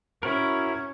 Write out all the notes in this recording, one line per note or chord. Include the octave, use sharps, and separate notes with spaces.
C#4 E4 F#4 A#4